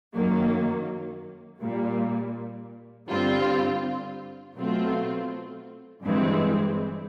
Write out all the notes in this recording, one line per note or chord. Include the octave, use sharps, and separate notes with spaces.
F#2 D#3 F#3 A#3
A#2 G3 A#3
G2 D3 G3 C4 F4
B2 F#3 A3 C4 F4
G1 G2 E3 G#3 C4